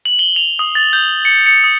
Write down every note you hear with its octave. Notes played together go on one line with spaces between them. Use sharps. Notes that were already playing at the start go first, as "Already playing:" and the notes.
F#7
G7
F7
D#6
A6
G6
C#7
C#7
D#6